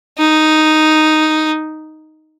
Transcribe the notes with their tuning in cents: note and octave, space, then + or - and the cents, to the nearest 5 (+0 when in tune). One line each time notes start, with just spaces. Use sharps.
D#4 +0